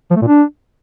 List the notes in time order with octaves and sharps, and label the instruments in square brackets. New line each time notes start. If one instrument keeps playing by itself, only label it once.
[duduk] F3
A3
A#2
D4